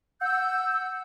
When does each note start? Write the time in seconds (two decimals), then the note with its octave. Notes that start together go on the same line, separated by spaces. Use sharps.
0.21 F#5 E6 G6